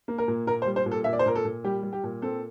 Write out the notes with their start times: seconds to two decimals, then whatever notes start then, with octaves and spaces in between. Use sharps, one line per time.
0.08 A#3
0.18 A#4
0.28 A#2
0.47 A#2 A#4
0.62 C5
0.66 G3
0.76 C5
0.86 A#2
0.91 A4
1.04 A#2 E5
1.13 D5
1.19 C5
1.26 A#2 A#4
1.35 A4
1.45 A#2
1.64 G3 G4
1.83 G3
1.93 G4
2.04 A#2
2.22 C4 A4